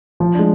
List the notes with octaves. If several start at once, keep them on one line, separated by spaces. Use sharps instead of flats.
F3
G#3 D4